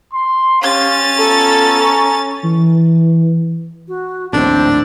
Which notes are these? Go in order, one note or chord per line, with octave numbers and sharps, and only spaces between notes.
C6
C#4 G4 F5 A6
B3 F4 A4 A#5
G#5 A#5 C#6
E3
F#4
A#1 D#2 A2 C4 D4